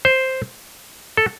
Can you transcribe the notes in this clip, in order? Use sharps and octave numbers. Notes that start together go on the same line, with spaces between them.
C5
A4